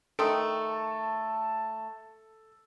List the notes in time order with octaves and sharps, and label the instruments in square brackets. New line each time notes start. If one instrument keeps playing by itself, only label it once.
[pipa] D#3 A3 [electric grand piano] A4 [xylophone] G5 C6 D#6
[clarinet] A5